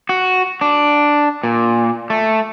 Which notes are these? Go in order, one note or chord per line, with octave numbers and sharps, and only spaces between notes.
F#4
D4
A#2
A3